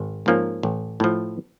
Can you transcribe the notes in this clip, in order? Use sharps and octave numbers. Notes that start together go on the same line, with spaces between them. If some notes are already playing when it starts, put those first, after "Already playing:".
Already playing: G#1
G#2 F3 A#3 C#4
A1
A2 F3